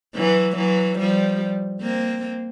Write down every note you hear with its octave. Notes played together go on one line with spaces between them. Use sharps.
E3 F#3
E3 F#3
F3 G3
A#3 C4